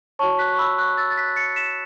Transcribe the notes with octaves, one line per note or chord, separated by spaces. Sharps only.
F#4 C#5 A5 C#6
F#6 B6
C#6
B5 E6
C#6 F#6
E6 A6
A6
F#6 B6
A6 C#7
B6 E7